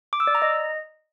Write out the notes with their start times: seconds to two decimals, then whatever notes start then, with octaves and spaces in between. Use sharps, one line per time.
0.13 D6
0.20 E6
0.27 D5
0.35 A#5
0.42 D#5